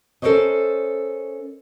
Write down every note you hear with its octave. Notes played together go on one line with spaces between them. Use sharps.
C#4 A4 A#4 C5 C#5 D#5